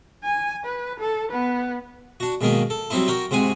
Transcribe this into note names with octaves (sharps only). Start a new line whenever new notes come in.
G#5
B4
A4
B3 B4
D4 F#4
G#2 B2 D#3 A#3 G#4
A4
F#3 G3 C4 D#4 E4
F#4 A#4 G5
G#2 C3 F#4 G#4 G#5